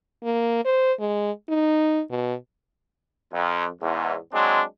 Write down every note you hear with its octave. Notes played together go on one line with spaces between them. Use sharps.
A#3
C5
G#3
D#4
B2
F2
E2 G#2
F#3 G#3 C4 D4